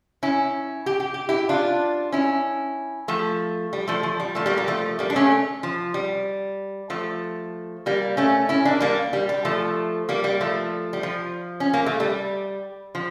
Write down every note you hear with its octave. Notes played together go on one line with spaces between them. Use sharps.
C#4 E4
G4
G4
G4
E4 G4
D4 F4
C#4 E4
F3 A3
G3
F3 A3
F3
G3
F3 A3
G3 A#3
G3 A#3
F3 A3
G3 A#3
D4
A3 C#4
F3
G3
F3 A3
G3 A#3
A3 C#4
C#4 E4
A#3 D4
G3 A#3
G3
G3
F3 A3
G3 A#3
G3 A#3
F3 A3
G3
F3
C#4
A#3
A3
G3
F3